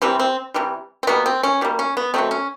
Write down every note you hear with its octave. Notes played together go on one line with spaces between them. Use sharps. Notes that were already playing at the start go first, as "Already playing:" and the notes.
C3 E3 G3 C4
C4
C3 E3 G3
C4
B2 G3 A#3 B3
C4
C#4
B2 G3 A#3
C#4
B3
B2 F#3 A3 C4
C#4